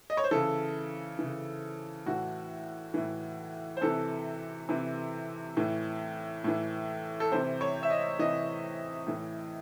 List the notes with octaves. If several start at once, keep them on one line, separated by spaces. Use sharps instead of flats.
D#5
C#5
C5
C#3 E3 A4
C#3 E3
A2 E3 F#4
A2 E3
C5
C3 E3 A4
C3 E3
A2 E3
A2 E3
A4
C3 E3 C5
C#5
E5
D#5
C3 E3 D#5
A2 E3